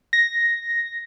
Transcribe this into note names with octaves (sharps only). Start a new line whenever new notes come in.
A#6